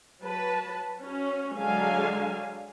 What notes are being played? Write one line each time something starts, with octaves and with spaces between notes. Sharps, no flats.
F#3 B4 A5
C#4 F#4
D3 F#3 G#3 D4 F5 G#5